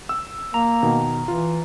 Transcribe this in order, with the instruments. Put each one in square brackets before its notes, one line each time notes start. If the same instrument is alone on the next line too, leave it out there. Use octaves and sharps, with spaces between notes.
[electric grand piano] E6
[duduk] A#3 [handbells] A#5
[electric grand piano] B2 D#3
[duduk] E3 [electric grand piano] F4